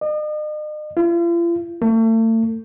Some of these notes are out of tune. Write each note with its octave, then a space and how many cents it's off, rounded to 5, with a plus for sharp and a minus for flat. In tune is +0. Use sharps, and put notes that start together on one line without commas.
D#5 -45
F4 -45
A3 +35